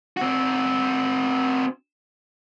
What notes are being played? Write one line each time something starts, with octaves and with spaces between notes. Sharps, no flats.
C4 F#4